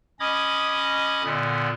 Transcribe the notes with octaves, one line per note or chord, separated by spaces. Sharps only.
C#4 D#5 B5 D6 D#6 G#6
A#2 D3 B3